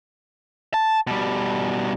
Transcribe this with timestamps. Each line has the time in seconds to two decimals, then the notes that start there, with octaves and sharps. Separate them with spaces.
0.74 A5
1.07 B2 G3